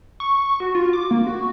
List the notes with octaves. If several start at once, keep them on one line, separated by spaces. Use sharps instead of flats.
C#6
F#4
F4
D6
A#3
F#4